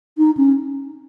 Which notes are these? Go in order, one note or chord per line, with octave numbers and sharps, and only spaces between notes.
D#4
C#4